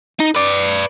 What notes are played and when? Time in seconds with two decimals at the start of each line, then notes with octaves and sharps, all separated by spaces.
0.20 D#4
0.35 B4 D5